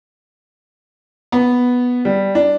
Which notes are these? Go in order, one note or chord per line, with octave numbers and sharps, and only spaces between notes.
B3
G3
D4